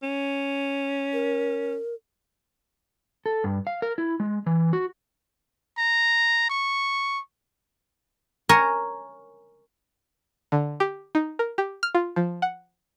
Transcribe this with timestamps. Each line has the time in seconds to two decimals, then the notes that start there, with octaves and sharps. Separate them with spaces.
0.03 C#4
1.13 A#4
3.26 A4
3.44 G2
3.67 F5
3.82 A#4
3.98 E4
4.20 G#3
4.46 E3
4.73 F#4
5.78 A#5
6.50 C#6
8.49 A#4 C#5 G#5
10.52 D3
10.80 G4
11.15 D#4
11.39 A#4
11.58 G4
11.83 F6
11.95 F4
12.16 F3
12.42 F#5